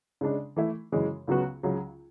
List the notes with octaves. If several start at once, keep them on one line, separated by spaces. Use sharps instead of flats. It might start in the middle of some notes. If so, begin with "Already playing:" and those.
C#3 G#3 D4
E3 A3 E4
F#2 C#3 E3 G#3
C#2 C#3 F#3 B3 F#4
C#2 C#3 F#3